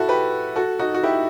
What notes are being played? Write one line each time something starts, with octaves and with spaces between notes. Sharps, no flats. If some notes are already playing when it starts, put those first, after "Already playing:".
Already playing: E4 F#4 A4
G4 B4
F#4 A4
D#4 F#4
F#4
E4 G4